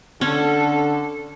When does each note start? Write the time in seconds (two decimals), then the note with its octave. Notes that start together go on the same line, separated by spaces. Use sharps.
0.21 D3 C#4 A4